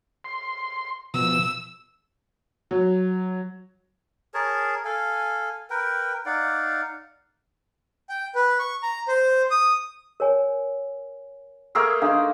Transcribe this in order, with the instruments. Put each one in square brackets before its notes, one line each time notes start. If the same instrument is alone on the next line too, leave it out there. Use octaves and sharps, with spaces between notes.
[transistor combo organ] C6
[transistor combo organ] B2 F3 [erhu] E6
[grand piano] F#3
[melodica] G#4 A#4 C#5 A5
A4 F5 G#5
A#4 B4 G5
D#4 D5 F5 F#5
[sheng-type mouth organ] G5
B4
C#6
A#5
C5
D#6
[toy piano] A#4 C#5 G#5
[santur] A3 A#3 G#4 [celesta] E6 F6
[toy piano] D4 A4 C6 [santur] D#4 [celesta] F5